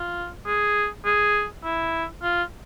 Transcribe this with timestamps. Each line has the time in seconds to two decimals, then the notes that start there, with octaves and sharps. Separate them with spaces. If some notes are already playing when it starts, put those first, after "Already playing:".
Already playing: F4
0.46 G#4
1.05 G#4
1.64 E4
2.22 F4